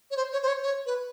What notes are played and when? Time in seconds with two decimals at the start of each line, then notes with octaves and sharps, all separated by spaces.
0.11 C#5
0.17 C5
0.32 C#5
0.43 C5
0.48 C#5
0.63 C#5
0.86 B4